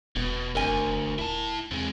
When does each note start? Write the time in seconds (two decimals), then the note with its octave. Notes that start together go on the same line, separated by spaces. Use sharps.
0.16 E1 B2 B3
0.55 F#1 D2 A#4 G#5
1.19 D#1 E4 A5
1.71 E2 C3 G#3